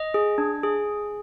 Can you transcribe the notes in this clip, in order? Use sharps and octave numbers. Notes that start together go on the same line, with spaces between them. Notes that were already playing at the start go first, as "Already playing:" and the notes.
Already playing: D#5
G#4
D4
G#4